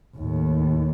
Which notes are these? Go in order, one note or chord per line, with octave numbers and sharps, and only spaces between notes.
D#2 A2